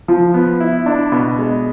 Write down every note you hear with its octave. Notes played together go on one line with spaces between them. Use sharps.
F3
B3
E4
D4
B2
G#3